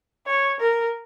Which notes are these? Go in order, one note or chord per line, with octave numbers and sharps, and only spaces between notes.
C#5
A#4